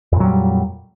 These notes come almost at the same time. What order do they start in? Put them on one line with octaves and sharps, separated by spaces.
F2 A#2 F#3 G3